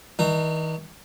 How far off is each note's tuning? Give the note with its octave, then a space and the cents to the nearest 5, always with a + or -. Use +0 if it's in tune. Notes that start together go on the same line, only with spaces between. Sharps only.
D#3 +45 D#4 -40